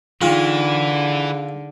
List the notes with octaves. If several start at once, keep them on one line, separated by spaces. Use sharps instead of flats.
D3 E3 D#4 F4 G#4